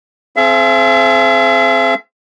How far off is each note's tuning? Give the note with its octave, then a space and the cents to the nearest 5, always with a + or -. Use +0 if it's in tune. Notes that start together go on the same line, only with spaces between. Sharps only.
C4 +0 G#4 +40 E5 +45